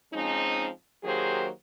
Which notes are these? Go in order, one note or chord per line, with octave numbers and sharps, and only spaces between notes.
F3 G#3 C4 C#4 D#4
D#3 F#3 A#3 G4 G#4 C5